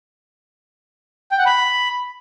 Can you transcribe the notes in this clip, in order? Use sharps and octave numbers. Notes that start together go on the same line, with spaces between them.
G5
F#5
B5